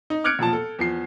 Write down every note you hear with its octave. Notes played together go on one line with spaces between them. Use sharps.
D#4
D6 F6 F#6 G#6 C#7 D7
E1 A#2 F3 A5
A4
E2 F3 C7